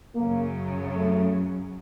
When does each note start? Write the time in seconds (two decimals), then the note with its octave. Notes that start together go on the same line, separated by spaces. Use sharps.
0.15 F#2 C#3 F#3 A#3
0.95 A3